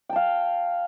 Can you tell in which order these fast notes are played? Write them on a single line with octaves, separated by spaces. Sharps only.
G5 A5 F5